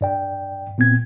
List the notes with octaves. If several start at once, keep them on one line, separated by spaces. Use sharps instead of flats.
G2 D5 G5
A#2 B3 C4 G#6